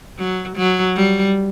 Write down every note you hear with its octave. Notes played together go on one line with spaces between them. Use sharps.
F#3
F#3
G3